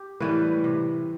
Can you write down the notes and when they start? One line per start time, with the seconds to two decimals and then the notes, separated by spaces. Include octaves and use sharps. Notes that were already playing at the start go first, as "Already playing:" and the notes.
Already playing: G4
0.20 A2 E3 G3 B4
0.64 C3